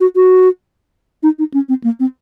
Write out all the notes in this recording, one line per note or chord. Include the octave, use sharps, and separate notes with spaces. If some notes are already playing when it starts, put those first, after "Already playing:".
F#4
F#4
D#4
D#4
C#4
C4
A#3
C4